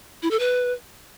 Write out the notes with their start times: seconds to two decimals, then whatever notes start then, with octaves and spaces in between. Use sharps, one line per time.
0.22 E4
0.31 A4
0.39 B4